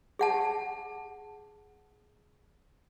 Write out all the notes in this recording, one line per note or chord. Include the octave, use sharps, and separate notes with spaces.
G#4 F#5 A5